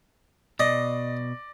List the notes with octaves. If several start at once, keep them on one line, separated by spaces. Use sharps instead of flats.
B2 D5 D#5 A#6